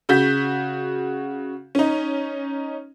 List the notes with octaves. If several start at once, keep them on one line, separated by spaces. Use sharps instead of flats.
C#3 F#4 G6 B6
C#4 D#4